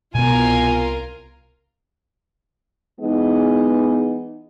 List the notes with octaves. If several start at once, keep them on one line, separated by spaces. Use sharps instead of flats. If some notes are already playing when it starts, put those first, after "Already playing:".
C2 B2 B3 F4 A#4 G#5
E3 G#3 B3 D#4 G#4